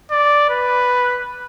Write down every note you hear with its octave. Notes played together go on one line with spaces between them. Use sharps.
D5
B4